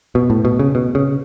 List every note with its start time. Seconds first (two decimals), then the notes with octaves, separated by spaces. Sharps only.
0.15 B2
0.30 A2
0.45 B2
0.59 C#3
0.75 B2
0.95 C#3